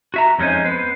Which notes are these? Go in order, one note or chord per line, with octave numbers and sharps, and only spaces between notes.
F#4 E5 A#5
F2 G#3 C#4 D#4 C5 G#5
B3 B4 C5